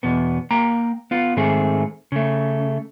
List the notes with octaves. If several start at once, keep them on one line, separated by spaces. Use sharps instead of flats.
E2 B2 B3
A#3 G5 A#5
B3 F4
G#2 D#3 A3 C4 G#4
C#3 A3